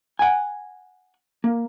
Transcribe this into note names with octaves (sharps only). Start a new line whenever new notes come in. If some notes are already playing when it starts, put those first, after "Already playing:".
F#5 G#5
A#3